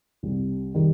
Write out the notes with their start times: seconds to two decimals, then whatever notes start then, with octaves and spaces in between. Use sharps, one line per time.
0.23 C2 C3 G3
0.75 D#3 G3